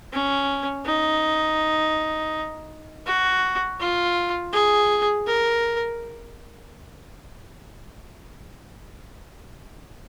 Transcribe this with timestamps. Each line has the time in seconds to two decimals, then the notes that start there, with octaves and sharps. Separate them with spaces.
0.13 C#4
0.86 D#4
3.06 F#4
3.80 F4
4.53 G#4
5.27 A#4